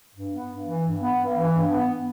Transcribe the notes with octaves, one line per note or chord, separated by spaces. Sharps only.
G2
B3
G2
E3
G2
B3
G2
E3
G2
B3